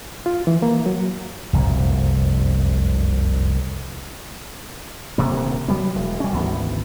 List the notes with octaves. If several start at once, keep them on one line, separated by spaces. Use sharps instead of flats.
F4
E3
A#3
F#3
F1 C2 F#2 A#2
D#1 D2 C3 A#3
F#3 G3 B3
E1 G#3
G3 C#4
G#1 D2 E3 B3